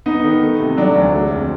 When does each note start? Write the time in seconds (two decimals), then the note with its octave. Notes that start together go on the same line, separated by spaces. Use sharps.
0.06 B3 D#4
0.24 D#3
0.42 A3
0.59 C3
0.77 F#3 D4
0.96 D2
1.14 G#3
1.31 F2